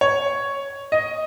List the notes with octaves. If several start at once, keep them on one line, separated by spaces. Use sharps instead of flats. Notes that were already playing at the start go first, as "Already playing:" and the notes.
C#5
D#5